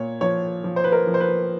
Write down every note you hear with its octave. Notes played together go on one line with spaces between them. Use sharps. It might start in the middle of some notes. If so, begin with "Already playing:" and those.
Already playing: A#2 C#5
F3 C#5
F3
C5
B4
A#4
F3
C5
B4